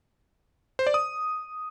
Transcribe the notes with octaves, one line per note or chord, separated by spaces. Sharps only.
C5
D5
D#6